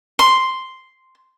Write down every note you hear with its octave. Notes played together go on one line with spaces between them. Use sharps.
C6